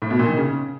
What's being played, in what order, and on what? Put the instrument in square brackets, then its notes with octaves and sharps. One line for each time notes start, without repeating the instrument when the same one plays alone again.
[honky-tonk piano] A2
B2
A#2
D#3
C#3